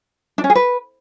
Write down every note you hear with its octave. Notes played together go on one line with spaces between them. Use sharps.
D4
C#4
G#4
B4